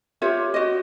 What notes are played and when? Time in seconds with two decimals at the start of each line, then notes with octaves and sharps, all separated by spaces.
0.22 F4 G4 C#5 E5
0.54 F#4 D#5